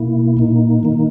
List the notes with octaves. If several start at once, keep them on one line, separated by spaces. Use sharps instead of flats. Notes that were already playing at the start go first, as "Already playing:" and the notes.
Already playing: B2 A#3 E4
A#2 A#3 D#4
D#3 A#3 D#4